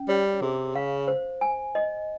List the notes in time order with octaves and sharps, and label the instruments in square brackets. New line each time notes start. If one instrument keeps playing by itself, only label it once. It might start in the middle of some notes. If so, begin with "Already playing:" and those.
Already playing: [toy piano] C#4
[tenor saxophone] G3 [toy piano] C#5
[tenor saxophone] C3 [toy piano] G#4
[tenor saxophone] C#3 [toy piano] F5
[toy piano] C5
G#5
D#5